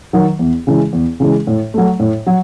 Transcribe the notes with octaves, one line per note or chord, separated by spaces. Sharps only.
D#3 F#3
E2
C#3 E3 G#3
E2
C#3 E3 G#3
A2
F#3 A3
A2
F#3